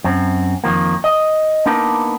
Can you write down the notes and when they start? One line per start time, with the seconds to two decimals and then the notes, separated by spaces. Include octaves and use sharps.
0.04 F#2 C4
0.64 F2 D#3 F3 A#3
1.04 D#5
1.66 A#3 B3 D4 D#4 A#4